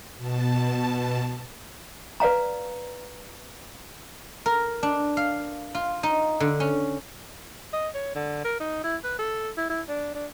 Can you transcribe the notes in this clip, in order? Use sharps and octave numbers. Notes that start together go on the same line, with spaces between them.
B2 A5
B4 D5 F5 A#5
A#4
D4
F5
F4
D#4
D3
C#4
D#5
C#5
D3
A#4
D#4
E4
B4
A4
E4
E4
D4
D4